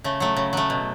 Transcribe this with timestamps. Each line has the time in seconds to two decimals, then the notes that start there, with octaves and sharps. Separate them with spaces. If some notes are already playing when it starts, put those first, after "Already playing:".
0.04 C#3 A3
0.20 F#3 A3
0.37 C#3
0.53 F#3 A3
0.70 B2